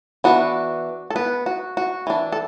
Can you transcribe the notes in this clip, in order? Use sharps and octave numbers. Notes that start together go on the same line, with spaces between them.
E3 B3 D4 F#4
A4
B3 B4
F#4
F#4
E3 D4
A4